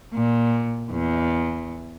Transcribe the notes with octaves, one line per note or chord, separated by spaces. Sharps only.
A#2
E2